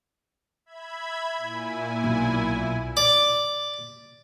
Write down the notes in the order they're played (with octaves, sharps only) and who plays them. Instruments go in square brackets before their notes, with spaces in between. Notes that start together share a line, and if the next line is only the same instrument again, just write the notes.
[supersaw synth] E5 B5 G#6
A#2 E4 G#5
[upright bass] B1
[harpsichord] D5